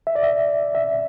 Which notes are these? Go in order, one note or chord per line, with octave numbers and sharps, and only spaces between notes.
E5
D5
E5
E5